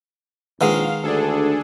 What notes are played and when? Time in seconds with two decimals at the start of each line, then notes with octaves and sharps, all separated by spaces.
0.61 A#1 D#3 G#3 B4 F5 F#5
1.03 D2 D4 G#4 A4